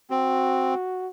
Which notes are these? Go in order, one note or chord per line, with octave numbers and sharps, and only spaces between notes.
C4 F#4